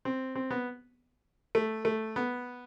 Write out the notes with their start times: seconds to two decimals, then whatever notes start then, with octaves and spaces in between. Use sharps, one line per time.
0.05 C4
0.35 C4
0.50 B3
1.55 A3
1.85 A3
2.16 B3